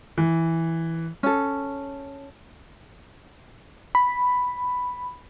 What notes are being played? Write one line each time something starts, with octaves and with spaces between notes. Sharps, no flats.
E3
C#4 A4
B5